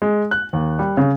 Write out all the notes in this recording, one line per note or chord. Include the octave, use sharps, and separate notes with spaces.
G#3
F#6
D#2
G3
C#3